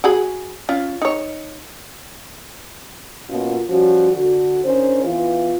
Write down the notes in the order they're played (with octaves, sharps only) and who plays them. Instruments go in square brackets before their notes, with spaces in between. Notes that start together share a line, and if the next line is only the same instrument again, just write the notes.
[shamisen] F#4 G#4 B5
C#4 F4
D#4 C#5
[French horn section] B2 A#3 C#4 F4
F3 G3 C#4 F#4
D3 F#4
D#3 C#4 D4 G#4 C5
E3 B3 F4